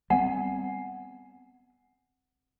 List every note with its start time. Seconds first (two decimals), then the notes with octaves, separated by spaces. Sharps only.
0.10 G3 B3 C4 F#5 G#5